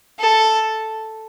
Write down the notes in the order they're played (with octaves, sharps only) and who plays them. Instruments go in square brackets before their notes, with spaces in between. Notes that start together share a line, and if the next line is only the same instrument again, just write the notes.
[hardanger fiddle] A4